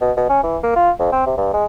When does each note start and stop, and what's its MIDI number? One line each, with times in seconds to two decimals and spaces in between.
0.01 0.11 47
0.17 0.27 47
0.29 0.41 61
0.43 0.57 52
0.63 0.74 58
0.76 0.91 65
0.99 1.10 41
1.12 1.25 60
1.26 1.34 48
1.38 1.51 43
1.53 1.65 56